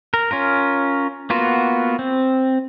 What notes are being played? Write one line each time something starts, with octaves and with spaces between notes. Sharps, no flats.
A#4
C#4 F4 A#4
A#3 B3 F4 F#4
C4